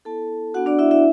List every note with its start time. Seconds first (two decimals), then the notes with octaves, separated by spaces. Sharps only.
0.05 B3 E4 A4 A5
0.54 B3 D4 F#4 F#5
0.66 D4 D5
0.79 E4 E5
0.91 E4 E5